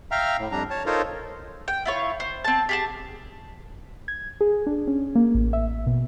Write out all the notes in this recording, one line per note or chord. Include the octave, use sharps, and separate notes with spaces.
E5 F5 G5 A#5 F6
A2
F2 G3 D4 A#5
C#5 A5
D#4 F4 A4 A#4 C5 C#5
G5
E4 F4 C#5
C5
C4 A5
G4 G#4 A5
G#6
G#4
D4
C#4
A#3
A1
E5
B2